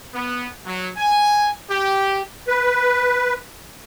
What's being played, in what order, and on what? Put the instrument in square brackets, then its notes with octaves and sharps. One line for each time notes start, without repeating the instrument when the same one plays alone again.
[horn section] B3
F#3
G#5
G4
[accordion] B4